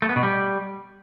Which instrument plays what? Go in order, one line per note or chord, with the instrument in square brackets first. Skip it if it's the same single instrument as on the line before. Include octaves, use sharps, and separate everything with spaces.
[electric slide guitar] A3
B3
B2
G3